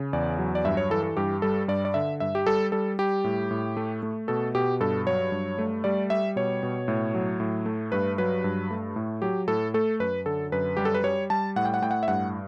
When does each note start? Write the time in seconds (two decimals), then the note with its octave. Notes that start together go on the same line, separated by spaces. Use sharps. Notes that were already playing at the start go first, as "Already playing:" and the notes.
Already playing: C#3
0.13 E2 D5
0.38 F#3
0.55 D5
0.64 G2 E5
0.77 C#5
0.90 E3 A4
1.03 A4
1.17 G2 G4
1.42 G3 A4
1.68 G2 D5
1.85 D5
1.94 D3 E5
2.20 G2 E5
2.35 G4
2.47 G3 A4
2.72 G3 A4
2.99 G3 G4
3.24 A2
3.51 A2
3.77 A3
4.03 A3
4.28 B2 A4
4.55 B2 G4
4.80 G2 A4
5.07 F#3 C#5
5.32 G2
5.59 A3
5.84 G3 D5
6.10 G3 E5
6.36 B2 C#5
6.63 B2
6.88 A2
7.15 F#3
7.40 A2
7.66 A3
7.92 G2 B4
8.18 F#3 B4
8.44 G2
8.71 A3
8.96 A2
9.22 F#3 G4
9.48 A2 A4
9.74 A3 A4
10.00 F#2 B4
10.26 D3 A4
10.52 F#2 B4
10.77 G3 G4
10.85 A4
10.95 B4
11.04 G3 C#5
11.30 G3 A5
11.56 A2 F#5
11.65 G5
11.74 F#5
11.82 A2 G5
11.91 F#5
12.03 E5
12.08 G2 F#5